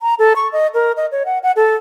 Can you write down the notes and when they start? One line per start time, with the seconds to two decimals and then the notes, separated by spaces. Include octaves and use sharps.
0.02 A#5
0.19 A4
0.36 C#6
0.53 D#5
0.74 A#4
0.97 D#5
1.12 C#5
1.26 F#5
1.43 F#5
1.56 A4